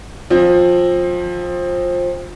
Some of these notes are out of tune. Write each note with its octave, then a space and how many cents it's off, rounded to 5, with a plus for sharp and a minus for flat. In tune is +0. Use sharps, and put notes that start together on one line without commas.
F3 +20 C4 +20